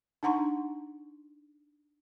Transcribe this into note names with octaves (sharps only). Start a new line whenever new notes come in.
D4 D#4 F#5 A#5 C6 C#6